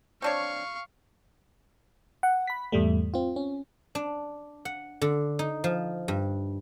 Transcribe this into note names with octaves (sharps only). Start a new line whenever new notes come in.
C4 D4 C#5 F5 C#6
F#5
B5 B6
E2 G#2 G3 A3
C4 F4
C#4
D4
F#5
D3
D#4
F3
G2